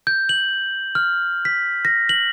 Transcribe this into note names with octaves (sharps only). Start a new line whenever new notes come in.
G6
F#7
F6
B6
A#6
F#7